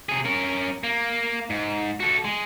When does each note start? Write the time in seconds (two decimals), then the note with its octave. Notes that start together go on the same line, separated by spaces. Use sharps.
0.09 C3 G#4
0.25 C#4 A#4
0.83 A#3
1.50 G#2
2.00 F#4 A4
2.25 G#3